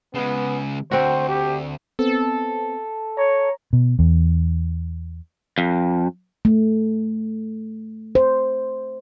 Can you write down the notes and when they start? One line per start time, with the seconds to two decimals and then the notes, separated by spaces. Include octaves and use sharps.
0.14 C#3 G#3 B3
0.91 D2 C4 F#4 C5
1.29 G4
1.99 B3 C4 A4
3.17 C#5 A#5
3.73 B2
3.99 E2
5.58 F2
6.45 A3
8.15 C5